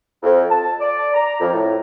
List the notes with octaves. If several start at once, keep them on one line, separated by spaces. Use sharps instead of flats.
F2
A5
D5
A#5
F2
A2